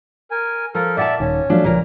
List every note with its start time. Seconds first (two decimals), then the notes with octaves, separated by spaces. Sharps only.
0.31 A#4 G#5
0.75 F3 A4 A#4
0.97 A#2 D5 E5 F#5 A5
1.20 D#1 D#3 C#4
1.50 F3 F#3 A3 D4 F4
1.64 C#2 A#2 F3 A#4